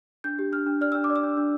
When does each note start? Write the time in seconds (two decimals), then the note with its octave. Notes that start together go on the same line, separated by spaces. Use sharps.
0.24 D4 G6
0.39 G4
0.52 D4 F6
0.66 D4
0.81 D5 F6
0.92 D4 E6
1.04 D6
1.10 D5
1.16 E6
1.23 D4
1.37 D4